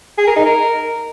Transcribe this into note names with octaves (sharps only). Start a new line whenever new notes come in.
G#4
A#4
D#4
A#4